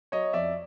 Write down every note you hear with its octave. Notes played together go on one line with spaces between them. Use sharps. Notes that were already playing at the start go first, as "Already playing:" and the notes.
F#3 C#5 D#5
F2 D5 E5